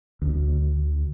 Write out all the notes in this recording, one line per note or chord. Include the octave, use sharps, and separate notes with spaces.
D2